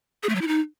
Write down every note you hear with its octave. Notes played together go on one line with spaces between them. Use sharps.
G#4
A3
F#3
E4
D#4